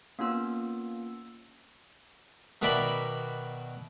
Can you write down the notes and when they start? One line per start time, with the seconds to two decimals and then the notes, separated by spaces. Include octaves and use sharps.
0.19 A#3 B3 C#4 F4 E6
2.62 B2 D#3 A#4 D5 E5 B5